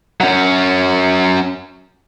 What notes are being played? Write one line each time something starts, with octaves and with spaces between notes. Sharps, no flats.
F#3 C#4